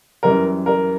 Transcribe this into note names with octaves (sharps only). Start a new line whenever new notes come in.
F#2 E3 G3 A#4
A#4